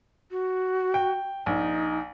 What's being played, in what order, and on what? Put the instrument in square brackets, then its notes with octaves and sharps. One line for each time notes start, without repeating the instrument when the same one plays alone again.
[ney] F#4
[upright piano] G5
[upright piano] A#1 [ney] D#4